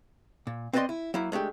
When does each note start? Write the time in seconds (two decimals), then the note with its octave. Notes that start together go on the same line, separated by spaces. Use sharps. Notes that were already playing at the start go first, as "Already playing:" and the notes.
0.47 A#2
0.73 C4 B4 C5 D5 D#5 C6
0.89 E4
1.14 F#3 A#3 E4
1.32 G#3 A3 D4 G4